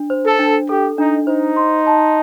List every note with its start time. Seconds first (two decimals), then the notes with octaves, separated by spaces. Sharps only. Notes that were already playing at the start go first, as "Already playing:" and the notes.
Already playing: D4
0.10 C5
0.25 A4
0.39 D4
0.69 G4 A4
0.98 D4 D#4
1.27 D#4 C5
1.56 C6
1.86 A5